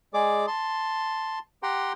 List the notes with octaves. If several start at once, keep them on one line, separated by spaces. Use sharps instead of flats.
G#3 G#4 D5 D6
A5 C6
G4 F#5 G5 A#5 C6